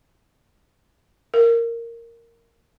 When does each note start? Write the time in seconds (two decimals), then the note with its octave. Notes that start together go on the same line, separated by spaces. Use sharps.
1.34 A#4